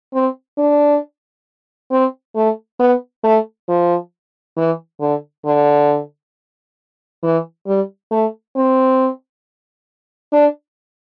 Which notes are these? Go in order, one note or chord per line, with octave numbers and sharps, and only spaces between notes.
C4
D4
C4
A3
B3
A3
F3
E3
D3
D3
E3
G3
A3
C4
D4